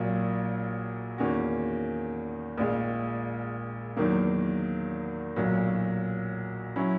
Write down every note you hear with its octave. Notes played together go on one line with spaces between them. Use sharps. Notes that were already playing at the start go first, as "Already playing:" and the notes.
Already playing: A#1 A#2 F#3
E2 D#3 A#3 C#4 F#4
A#1 A#2 G#3
E2 D#3 F#3 A#3
B1 A#2 F#3
F#3 C#4 E4